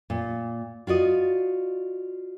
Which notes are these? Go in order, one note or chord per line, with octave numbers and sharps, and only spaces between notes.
A#2
F4 F#4 D5 D#5